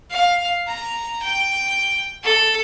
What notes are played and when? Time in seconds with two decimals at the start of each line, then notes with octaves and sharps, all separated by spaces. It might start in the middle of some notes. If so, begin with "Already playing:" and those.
0.10 F5
0.67 A#5
1.22 G5
2.23 A4